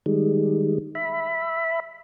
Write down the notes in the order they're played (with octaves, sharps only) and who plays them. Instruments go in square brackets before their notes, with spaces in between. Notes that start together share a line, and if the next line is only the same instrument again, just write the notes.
[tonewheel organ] D#3 G3 G#3
E5 B5